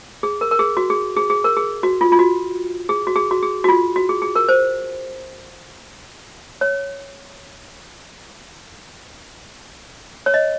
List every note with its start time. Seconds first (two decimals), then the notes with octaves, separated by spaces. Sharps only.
0.23 G#4
0.41 A#4
0.51 A#4
0.59 G#4
0.77 F#4
0.90 G#4
1.16 G#4
1.30 G#4
1.44 A#4
1.57 G#4
1.83 F#4
2.01 F4
2.12 F4
2.19 F#4
2.89 G#4
3.07 F#4
3.16 G#4
3.31 F#4
3.43 G#4
3.64 F#4
3.68 F4
3.96 F#4
4.09 G#4
4.22 G#4
4.36 A#4
4.49 C5
6.61 C#5
10.26 C#5
10.34 D#5